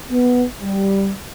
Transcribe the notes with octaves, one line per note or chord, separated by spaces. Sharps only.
B3
G3